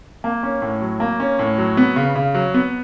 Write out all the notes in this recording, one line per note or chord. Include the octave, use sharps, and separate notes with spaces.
A#3
C#4
A2
F#3
A#3
C#4
A2
F#3
B3
C#3
C#3
F#3
B3